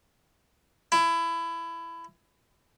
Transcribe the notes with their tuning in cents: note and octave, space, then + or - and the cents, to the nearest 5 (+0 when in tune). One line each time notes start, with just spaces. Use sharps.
E4 +20